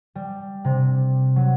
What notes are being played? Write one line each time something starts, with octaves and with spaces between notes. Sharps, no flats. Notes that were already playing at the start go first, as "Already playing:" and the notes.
G3
C3
F#3